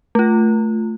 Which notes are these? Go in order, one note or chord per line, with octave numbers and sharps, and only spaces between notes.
A3 F4